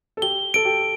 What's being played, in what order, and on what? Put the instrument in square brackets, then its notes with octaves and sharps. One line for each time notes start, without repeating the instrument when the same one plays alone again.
[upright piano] A4
[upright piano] G4 [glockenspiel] G7
[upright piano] A4 [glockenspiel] D7
[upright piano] G4